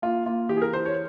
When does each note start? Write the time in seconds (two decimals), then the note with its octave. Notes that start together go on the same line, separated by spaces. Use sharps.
0.02 A#3 F4
0.26 A#3 F4
0.49 E3 G4
0.57 G#4
0.62 A#4
0.73 E3 C5
0.85 C#5